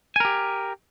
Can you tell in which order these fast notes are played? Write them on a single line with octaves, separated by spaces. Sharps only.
G#5 A#4 G4